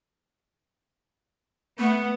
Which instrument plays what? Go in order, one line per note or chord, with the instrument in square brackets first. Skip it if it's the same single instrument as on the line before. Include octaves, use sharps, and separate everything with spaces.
[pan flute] A3 [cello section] B3